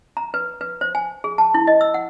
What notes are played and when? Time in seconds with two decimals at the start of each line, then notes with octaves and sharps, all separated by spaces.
0.17 A#5
0.34 B4
0.61 B4
0.81 C5
0.95 G#5
1.24 G#4
1.38 A5
1.54 E4
1.67 D#5
1.81 E6
1.94 F#5